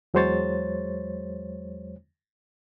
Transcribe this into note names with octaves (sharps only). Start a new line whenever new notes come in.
E2 F#3 G#3 C5 C#5 A6